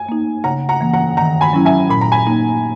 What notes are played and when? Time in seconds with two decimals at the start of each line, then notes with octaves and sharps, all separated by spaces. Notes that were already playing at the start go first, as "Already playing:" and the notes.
Already playing: G#5
0.09 A#3 D#4
0.44 C#3 F#5 A#5
0.69 F#5 A#5
0.81 E3 A#3
0.94 F#5 A#5
1.17 D#3 F#5 A#5
1.41 G#5 B5
1.53 F#3 C#4 E4
1.65 E5 G#5
1.89 A#2 B5
2.01 A#5
2.12 G#5 B5
2.27 A#3 D#4